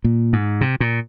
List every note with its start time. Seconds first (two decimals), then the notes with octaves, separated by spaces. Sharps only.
0.04 A#2
0.33 G#2
0.61 C3
0.80 A#2